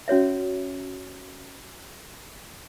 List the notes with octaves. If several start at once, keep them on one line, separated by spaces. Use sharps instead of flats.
C#4 F#4 C#5 E5